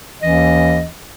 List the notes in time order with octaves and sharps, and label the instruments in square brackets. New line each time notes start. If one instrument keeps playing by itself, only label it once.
[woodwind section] D#2 E3 C#4 D#5